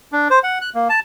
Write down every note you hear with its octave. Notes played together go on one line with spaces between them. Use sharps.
D4
C5
F#5
F#6
A#3
A5